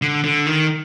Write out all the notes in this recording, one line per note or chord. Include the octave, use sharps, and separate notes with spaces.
D3
D3
D#3